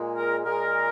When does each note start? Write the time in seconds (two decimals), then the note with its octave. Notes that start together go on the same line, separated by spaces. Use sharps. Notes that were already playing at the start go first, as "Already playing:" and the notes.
Already playing: A#2 G#3
0.16 A#4
0.45 A#2 G#3 A#4